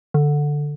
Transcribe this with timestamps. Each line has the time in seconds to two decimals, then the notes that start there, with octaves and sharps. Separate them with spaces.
0.14 D3